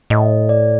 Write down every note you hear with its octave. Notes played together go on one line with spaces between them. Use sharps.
A2 D#5
D5